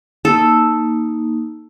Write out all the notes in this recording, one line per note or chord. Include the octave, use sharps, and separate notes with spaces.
A#3 D#4 A4